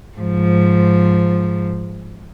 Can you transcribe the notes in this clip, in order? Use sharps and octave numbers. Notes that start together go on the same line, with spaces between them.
G#2 F3